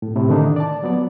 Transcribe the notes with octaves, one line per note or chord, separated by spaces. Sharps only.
A2
A2 C3
D3 D#3 A3 D4 D#4
D5 A5
F3 F#3 B3 D5